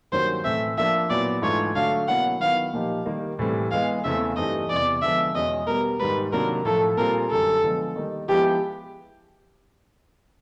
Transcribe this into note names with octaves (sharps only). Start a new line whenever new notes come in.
G2 D#3 F#3 A#3 C#4 C5
A2 E3 A3 C4 E5
F3 A#3 D4 F4 E5
A#2 F#3 B3 E4 D5
G#2 E3 A3 D4 F4 C#5
D3 F#3 A3 D4 F5
B2 F#3 A#3 C#4 E4 F#5
D#3 F#3 B3 E4 F5
A#2 F3 A#3 D#4 G4
D#3 G3 A#3 D#4
A2 E3 G3 C4
E3 G#3 B3 F5
E2 C#3 E3 A3 C4 E5
G2 E3 A3 C4 D#4 D#5
E2 C3 E3 D5
D3 F3 G#3 B3 E5
E2 B2 G#3 C#4 D#5
B2 G3 B3 A#4
G#2 D#3 G3 B4
C3 D#3 F#3 A#3 D4 A#4
A2 F3 A3 A4
A#2 G3 C4 F4 G#4 A#4
F#2 D3 G3 A4
D3 F3 G#3 B3
D#3 G3 A#3 D#4
F3 G#3 B3 E4 G4